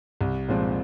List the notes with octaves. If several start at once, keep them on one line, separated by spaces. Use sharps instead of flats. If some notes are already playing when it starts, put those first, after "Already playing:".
C2
A#2 F3 G#3 C4